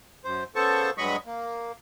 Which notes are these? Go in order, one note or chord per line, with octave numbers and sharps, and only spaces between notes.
F#2 C5
C#3 B3 A4 C5 A5 C#6
G2 F#3 G#3 D#5 B5 C#6
A#3